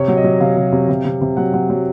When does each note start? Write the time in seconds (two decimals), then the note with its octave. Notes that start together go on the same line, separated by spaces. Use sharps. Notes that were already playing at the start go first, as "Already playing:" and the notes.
Already playing: C3 C#5
0.08 F#3
0.17 D#5
0.24 F#3
0.40 C3 F5
0.57 C3
0.72 C3
0.89 C3
1.05 C3
1.21 C3
1.37 F#3 F#5
1.54 F#3
1.70 F#3